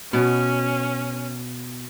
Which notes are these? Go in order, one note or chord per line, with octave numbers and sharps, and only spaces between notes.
B2 B3 C#4